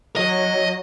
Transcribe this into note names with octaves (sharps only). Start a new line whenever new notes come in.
F#3 D#5